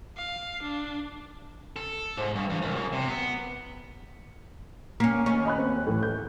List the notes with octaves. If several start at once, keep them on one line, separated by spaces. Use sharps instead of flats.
F5
D4
A4
G#2
G2
E2
C2
F#2
C3
B3
A#3 C#4
D#2 C#4
D#5 B5 F#6
C4
A2 E3
G6